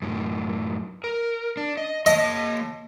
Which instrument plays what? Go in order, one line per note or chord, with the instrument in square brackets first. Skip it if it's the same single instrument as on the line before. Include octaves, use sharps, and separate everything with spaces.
[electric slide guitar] F#2 A2
A#4
D4
D#5
[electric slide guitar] A#3 C#5 A5 [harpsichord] D#5